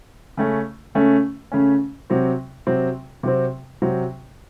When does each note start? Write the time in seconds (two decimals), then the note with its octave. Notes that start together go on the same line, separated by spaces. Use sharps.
0.37 C#3 A3 C#4
0.95 C#3 A3 C#4
1.52 C#3 A3 C#4
2.10 C3 F#3 C4
2.67 C3 F#3 C4
3.23 C3 F#3 C4
3.82 C3 F#3 C4